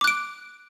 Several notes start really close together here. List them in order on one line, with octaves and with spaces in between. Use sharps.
D6 F#6 D7